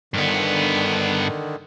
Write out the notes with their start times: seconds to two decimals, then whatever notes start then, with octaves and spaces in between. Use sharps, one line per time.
0.14 G2 D3 D#3 B3